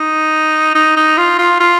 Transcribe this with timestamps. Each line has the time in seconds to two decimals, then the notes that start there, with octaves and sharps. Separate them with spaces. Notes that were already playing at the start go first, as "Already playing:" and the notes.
Already playing: D#4
0.75 D#4
0.97 D#4
1.17 F4
1.39 F4
1.60 F4